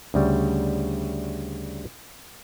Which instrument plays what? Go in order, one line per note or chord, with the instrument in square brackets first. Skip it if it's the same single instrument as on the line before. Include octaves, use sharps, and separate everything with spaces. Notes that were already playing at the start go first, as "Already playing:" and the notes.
[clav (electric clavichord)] D2 C#3 G3